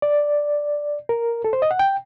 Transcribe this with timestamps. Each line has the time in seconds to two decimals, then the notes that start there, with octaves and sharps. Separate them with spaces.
0.02 D5
1.09 A#4
1.44 A4
1.53 C5
1.62 D#5
1.71 F#5
1.79 G5